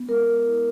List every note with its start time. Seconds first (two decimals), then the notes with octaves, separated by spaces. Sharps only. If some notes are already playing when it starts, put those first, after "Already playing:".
Already playing: B3
0.09 G#3 A#4
0.27 G#3
0.46 E4